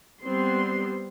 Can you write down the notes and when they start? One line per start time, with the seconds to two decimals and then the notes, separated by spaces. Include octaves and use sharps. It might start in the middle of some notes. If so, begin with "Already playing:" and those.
0.23 G3 B3 C4 C6